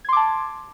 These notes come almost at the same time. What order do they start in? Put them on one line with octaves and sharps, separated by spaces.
G#6 C6 D6 A5